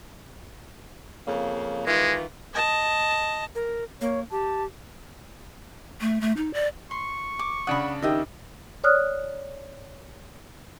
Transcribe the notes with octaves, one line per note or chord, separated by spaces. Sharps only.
F2 C#3 A#3
D#3 E3 G#3 F4
D#5 A5
A#4
A#3 C#5
G4 A5
A3
A3
D#4
D5
C6 C#6
D6
C#3 D4 F#5 B5 D#6
D#3 G4 D#5 E5 G5
C#5 D5 D#6 F6 F#6